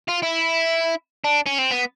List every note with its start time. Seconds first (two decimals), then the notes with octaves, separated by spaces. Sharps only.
0.09 F4
0.23 E4
1.24 D4
1.46 C#4
1.59 C4
1.71 B3